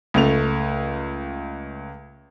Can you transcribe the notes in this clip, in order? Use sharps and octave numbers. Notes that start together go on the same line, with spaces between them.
C#2 A3 F7